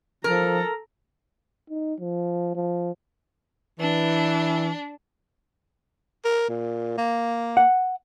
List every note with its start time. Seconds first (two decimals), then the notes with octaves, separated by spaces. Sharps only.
0.24 F3 A4 A#4 A#5
1.70 D#4
2.00 F3
2.55 F3
3.80 E3 D4
6.25 A#4
6.49 A#2
6.98 A#3
7.57 F#5